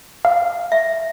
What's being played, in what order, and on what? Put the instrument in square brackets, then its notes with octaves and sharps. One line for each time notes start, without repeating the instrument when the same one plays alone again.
[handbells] F5
[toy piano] E5